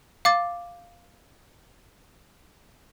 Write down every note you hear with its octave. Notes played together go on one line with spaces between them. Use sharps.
F5 D6 A6